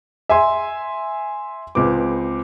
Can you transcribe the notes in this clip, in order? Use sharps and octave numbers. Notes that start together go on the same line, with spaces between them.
E5 G#5 C6
C#2 C4 B4 D6